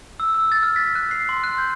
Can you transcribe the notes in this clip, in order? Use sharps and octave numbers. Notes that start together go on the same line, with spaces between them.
E6
E6
A6
F6
B6
F#6
C7
C6
F#6
G6